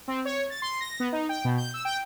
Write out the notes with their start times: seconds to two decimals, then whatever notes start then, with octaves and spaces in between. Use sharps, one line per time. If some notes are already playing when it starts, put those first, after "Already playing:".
0.08 C4
0.25 C#5
0.50 A6
0.62 C6
0.80 A#6
1.00 B3
1.12 D#4
1.29 G5
1.45 B2
1.58 G6
1.74 E6
1.85 G5